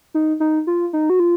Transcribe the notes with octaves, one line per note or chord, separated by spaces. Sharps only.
D#4
D#4
F4
D#4
F#4
F4